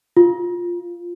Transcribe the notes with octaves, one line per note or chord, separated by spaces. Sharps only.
F4